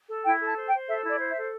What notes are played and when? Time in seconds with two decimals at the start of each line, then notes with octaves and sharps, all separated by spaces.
0.09 A4
0.25 E4 G5
0.41 A4
0.47 A5
0.56 C5
0.68 G5
0.73 C5
0.88 A4 E5
1.04 E4
1.09 D5
1.20 C5
1.30 E5
1.36 A4